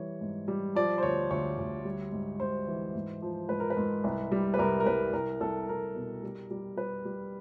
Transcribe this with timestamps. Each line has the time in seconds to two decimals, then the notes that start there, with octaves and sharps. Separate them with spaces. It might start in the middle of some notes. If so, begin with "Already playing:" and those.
Already playing: E3 G3 C#5
0.21 G#2
0.48 G3
0.75 F3 D5
0.98 C5
1.03 D2 C#5
1.31 D2 C#5
1.58 D2
1.85 G3
2.12 G#2
2.40 G#2 C5
2.67 E3
2.95 G#2
3.22 F3
3.49 G#2 B4
3.60 A#4
3.70 B4
3.77 G#2
4.04 C2
4.32 G3
4.54 B4
4.58 C2 A#4
4.80 A#4
4.86 C2 B4
5.13 C2 A#4
5.40 C2 A4
5.69 C2 A#4
5.95 B2
6.23 G3
6.51 G3
6.77 G3 B4
7.05 G3